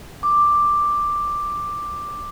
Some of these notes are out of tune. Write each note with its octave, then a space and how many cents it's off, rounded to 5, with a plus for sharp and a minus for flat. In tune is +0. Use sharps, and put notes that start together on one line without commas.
D6 +5